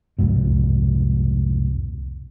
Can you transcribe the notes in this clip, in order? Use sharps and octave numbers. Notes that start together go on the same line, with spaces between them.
C2 F2 G#2 B2